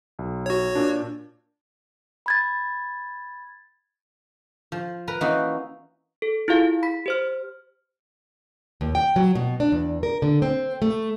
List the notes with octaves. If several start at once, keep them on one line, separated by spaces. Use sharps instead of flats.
B1
F#4 C#5
A#2 D4
B5 G#6 A6
F3
A#4 B4 A#5
E3 A#3 C#4 D#4 F#4 B4
A4
E4 F4 G#4 F5
B5 B6
G4 C5 F6
D#2
G5
F#3
B2
D4
E2
A#4
D3
C4
A3